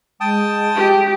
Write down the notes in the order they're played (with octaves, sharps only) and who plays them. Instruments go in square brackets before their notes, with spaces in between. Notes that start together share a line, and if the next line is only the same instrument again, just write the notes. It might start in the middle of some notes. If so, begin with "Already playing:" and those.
[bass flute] G#3 [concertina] G5 A5 D#6
[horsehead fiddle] G4